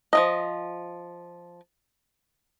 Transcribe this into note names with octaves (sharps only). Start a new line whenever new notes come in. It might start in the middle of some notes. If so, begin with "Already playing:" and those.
F3 F#3 D#5